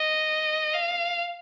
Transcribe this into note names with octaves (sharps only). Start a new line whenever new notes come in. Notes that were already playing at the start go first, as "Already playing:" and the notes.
Already playing: D#5
F5